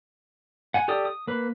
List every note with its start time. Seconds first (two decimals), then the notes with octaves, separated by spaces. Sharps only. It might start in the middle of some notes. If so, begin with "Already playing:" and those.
0.74 F#5 G#5
0.88 G4 A4 D5 D#6
1.05 D#6
1.27 A#3 B4